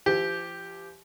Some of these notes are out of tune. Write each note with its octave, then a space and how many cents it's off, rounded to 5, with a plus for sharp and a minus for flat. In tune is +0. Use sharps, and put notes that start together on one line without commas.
F3 -40 G4 +0